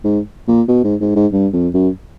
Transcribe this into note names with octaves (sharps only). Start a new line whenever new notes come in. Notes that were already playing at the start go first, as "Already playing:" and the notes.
G#2
A#2
B2
G#2
G#2
G#2
G2
F2
F#2